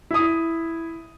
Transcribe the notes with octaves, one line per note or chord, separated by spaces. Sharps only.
E4 D#6